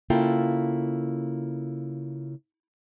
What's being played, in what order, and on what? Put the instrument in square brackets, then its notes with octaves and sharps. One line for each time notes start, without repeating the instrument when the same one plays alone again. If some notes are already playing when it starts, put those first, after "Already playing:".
[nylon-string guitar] C#3 A#3 E4 F4 A4 G5